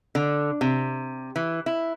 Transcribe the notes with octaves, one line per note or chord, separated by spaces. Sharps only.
D3
C3
E3
E4